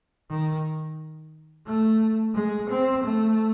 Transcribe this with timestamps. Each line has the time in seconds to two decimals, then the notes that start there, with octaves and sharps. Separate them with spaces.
0.30 D#3
1.66 A3
2.35 G#3
2.70 C4
3.03 A3